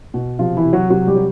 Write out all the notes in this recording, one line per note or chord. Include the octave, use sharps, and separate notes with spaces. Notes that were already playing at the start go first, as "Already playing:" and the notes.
B2
C3 F3 F4
E3 E4
C3
F#3 F#4
C3 F#3 F#4
G3 G4
F#3